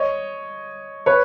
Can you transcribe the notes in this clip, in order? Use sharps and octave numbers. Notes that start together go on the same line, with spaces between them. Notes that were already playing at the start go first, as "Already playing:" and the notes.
Already playing: C#5 D#5
B4 C#5